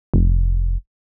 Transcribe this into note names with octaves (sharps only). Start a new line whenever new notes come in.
F1